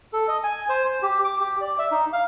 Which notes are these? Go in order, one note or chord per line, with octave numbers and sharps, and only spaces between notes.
A4
D#5
G#5
C5
C5
G4
D6
G4
D5
E5
D#4
F5